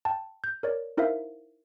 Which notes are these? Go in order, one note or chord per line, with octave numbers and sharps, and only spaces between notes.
G5 A5
G6
A#4 C#5 D5
D#4 E4 A#4 C5 E5 F5